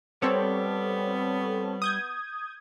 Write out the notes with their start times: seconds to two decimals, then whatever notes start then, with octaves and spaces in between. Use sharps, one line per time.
0.22 G3 B3 C4 A4 C#5
1.82 D#6 G6 G#6